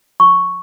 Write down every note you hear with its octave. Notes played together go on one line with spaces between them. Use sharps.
C#6